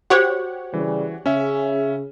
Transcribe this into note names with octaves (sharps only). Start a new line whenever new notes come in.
F#4 G4 C5 C#5 F#5
C#3 E3 G3
C#3 C#4 E5